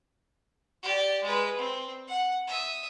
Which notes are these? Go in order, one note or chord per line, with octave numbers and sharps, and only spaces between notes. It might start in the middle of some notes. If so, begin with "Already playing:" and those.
G4 D5
G#3 B4
C4
F#5
E5 D#6